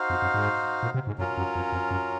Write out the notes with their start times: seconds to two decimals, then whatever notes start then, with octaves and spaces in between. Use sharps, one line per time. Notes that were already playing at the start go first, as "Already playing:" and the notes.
Already playing: D#4 F#4 C5 F5
0.10 F2
0.22 F#2
0.34 G#2
0.83 A#2
0.94 C3
1.07 G#2
1.18 F#2 F#3 C#4 F4 A#4
1.37 F#2
1.55 F2
1.72 F2
1.91 F#2